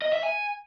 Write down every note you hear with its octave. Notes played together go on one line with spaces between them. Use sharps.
D#5
E5
G#5